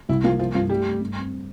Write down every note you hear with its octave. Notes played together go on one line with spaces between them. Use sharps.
C2 E4
F3 A#3 F4
F3 E4 F4
G2 F3 F4
G3 A3 G4
A3
G2
C4